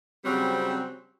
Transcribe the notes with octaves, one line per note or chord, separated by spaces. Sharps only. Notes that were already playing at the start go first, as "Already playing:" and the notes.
C#3 F#3 G3 C4